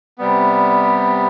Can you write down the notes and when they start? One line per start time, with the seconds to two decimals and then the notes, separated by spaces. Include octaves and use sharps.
0.18 C3 G3 B3